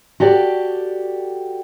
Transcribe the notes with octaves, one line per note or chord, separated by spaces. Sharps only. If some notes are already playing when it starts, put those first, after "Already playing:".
F#4 G4 A4 D5